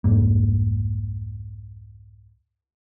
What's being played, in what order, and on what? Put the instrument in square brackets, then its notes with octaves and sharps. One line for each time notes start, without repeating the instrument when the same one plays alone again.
[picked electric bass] C2 F2 G#2 A#3